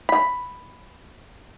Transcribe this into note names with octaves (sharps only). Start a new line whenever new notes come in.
B5